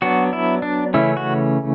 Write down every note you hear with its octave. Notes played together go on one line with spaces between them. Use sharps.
F#3 B3 D4 F#4
E4
D4
C#3 E3 A3 C#4 E4
F#4